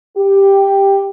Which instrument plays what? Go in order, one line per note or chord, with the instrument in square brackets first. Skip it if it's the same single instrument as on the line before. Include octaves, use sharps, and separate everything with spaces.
[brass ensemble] G4